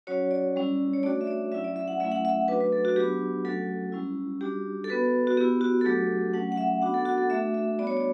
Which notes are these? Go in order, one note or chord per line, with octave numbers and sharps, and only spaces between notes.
F#3 C#4 F#4 C#5
D5
G3 C#4 E4
C#5
A3 D4 F#4 D5
E5
D5
F#3 C#4 E4 E5
D5
E5
F#5
F#3 A3 C#4 E4 E5
F#5
E5
F#3 A3 D4 F#4 B4
B4
A4
F#4
F#3 B3 D4 G4
F#3 A3 C#4 F#4 A4
G3 C#4 E4
G3 D4 F#4 G4
A4
B3 F#4 B4
F#4
B3 E4 G4
F#4
A4
F#3 A3 D4 F#4 G4
F#3 A3 C#4 F#5
F#5
E5
B3 D4 F#4 F#5
A4
F#4
A4
A3 D4 F#4 E5
E5
G3 B3 D4 F#4 D5
C#5
D5